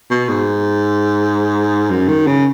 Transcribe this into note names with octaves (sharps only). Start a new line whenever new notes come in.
B2
G#2
F#2
D#3
C#3